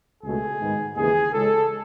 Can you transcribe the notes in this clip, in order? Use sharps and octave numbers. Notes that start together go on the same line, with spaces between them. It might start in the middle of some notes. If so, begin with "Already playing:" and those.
C#2 B2 A3 G#4
G#2 D#3 G#3 B3
D#2 C#3 E3 B3 G#4
C#2 C#3 G#3 A4